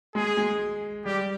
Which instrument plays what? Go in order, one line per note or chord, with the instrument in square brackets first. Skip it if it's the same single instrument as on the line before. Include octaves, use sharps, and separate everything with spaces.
[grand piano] G#3 [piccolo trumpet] G#4
[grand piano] G#3
[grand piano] G3 [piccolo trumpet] G4